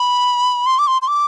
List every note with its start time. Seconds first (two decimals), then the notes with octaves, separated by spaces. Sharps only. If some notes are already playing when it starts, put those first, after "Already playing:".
Already playing: B5
0.66 C6
0.79 D6
0.87 C6
1.02 C6
1.08 D6